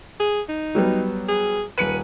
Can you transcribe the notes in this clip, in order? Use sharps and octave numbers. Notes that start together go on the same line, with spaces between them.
G#4
D#4
F#3 G3 B3
G#4
D#1 B4 C#7 D#7